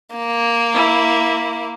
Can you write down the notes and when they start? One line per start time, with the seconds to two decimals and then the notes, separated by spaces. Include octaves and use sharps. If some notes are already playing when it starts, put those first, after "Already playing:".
0.16 A#3
0.74 E4